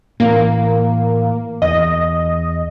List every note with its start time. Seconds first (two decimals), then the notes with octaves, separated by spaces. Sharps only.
0.20 A2 E3 A#3
1.62 E2 D#5